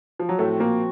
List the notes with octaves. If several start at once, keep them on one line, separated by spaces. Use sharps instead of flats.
F3
F#3
A2 F3 A3 C4 F#4
A#2 A#3